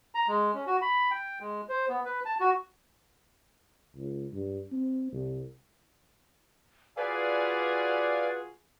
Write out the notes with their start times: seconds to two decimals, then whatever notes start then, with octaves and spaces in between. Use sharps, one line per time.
0.15 A#5
0.28 G#3
0.54 C#4
0.67 F#4
0.82 B5
1.11 G5
1.40 G#3
1.69 C5
1.89 B3
2.05 B4
2.25 A5
2.40 F#4
3.96 C#2
4.33 G2
4.73 C4
5.12 C2
6.97 F4 F#4 G#4 B4 D5 F5 G#5